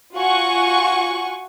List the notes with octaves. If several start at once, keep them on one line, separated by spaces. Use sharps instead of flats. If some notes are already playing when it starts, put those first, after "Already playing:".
F4 F#4 F#5 G#5 C#6